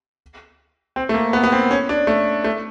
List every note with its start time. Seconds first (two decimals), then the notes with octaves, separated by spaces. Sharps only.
0.96 C4
1.09 A3
1.14 A#3
1.33 B3
1.43 B3
1.52 C4
1.71 C#4
1.89 D4
2.07 A3
2.44 A3